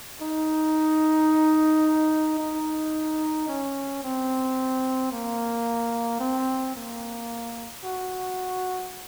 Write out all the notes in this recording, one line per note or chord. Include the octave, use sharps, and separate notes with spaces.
D#4
D#4
C#4
C4
A#3
C4
A#3
F#4